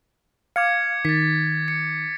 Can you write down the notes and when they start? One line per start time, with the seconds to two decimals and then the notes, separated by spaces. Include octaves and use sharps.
0.56 F5 D6 G#6 C#7
1.05 D#3 A6 B6
1.68 C#7